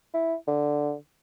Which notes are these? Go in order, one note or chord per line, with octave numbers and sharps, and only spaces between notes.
E4
D3